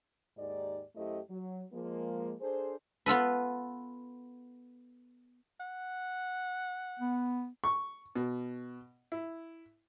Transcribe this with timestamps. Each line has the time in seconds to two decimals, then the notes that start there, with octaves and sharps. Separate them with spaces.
0.38 D#2 G#2 D#4 G4 D5
0.96 F#2 A3 E4 G4 C5 D#5
1.30 F#3
1.72 F3 G#3 A#3
2.41 D4 G#4 A4 C5
3.06 B3 F4 A4 B4
5.60 F#5
6.99 B3
7.64 C#6
8.16 B2
9.12 E4